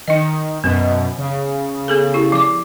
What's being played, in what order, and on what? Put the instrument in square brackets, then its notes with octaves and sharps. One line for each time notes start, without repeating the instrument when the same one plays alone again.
[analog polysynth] D#3 [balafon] D#4 D#5
[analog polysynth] F#2 B2 [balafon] B3
[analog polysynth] C#3
[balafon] B3 G#4 A4
E4 G4
F3 D6